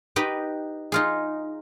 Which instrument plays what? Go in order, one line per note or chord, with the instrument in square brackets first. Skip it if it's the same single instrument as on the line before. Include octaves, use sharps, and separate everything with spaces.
[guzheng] D#4 G4 B4 D#5
D#4 F4 G#4